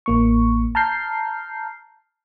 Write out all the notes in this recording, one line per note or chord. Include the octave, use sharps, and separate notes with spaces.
A1 A#3 C#6
A5 A#5 F6 G6 C7